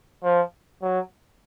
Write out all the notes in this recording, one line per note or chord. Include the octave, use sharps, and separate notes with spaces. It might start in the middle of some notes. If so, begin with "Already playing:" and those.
F3
F#3